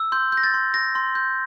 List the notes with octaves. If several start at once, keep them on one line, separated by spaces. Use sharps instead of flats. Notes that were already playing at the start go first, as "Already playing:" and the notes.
Already playing: E6
C6 G6
G6
A#6
A6
C6
G6 A#6
C6
G6